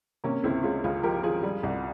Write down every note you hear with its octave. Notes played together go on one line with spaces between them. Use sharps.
C3 A#3 C#4
C#2 C4 E4
G#3 C#4 F4
C#2 F4 G#4
F3 G4 A#4
F3 F4 G#4
G3
C2